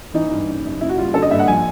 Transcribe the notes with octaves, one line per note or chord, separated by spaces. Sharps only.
E3 D#4
G2
C#3
F#2
C#3 E4
F#4
G3 F4
D3 A4
D#5
G2 E5
F#5
F3 G#5